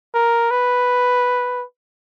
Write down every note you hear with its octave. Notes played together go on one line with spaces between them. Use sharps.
A#4
B4